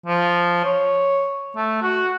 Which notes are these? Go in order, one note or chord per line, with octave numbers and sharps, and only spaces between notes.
F3
C#5
A3
F#4